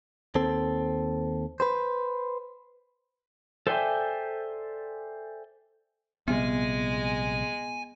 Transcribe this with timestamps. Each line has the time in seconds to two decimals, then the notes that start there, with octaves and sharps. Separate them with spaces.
0.35 D#2 C4 A4
1.60 B4 C5
3.67 A4 C5 D5 E5 G5 G#5
6.28 A#1 C3 G3 G#3 B3 G#5